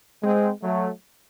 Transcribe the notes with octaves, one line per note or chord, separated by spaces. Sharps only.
G#3 C4
F#3 A3